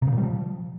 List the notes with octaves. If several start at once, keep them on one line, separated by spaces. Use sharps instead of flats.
C3
C#3
A#2
G3
F3